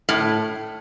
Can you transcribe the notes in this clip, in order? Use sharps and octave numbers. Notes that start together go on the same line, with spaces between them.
A2